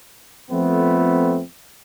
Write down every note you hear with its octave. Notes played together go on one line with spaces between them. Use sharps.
F2 F3 A3 B3 C4